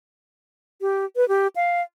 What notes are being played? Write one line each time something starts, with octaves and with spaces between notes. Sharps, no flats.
G4
B4
G4
F5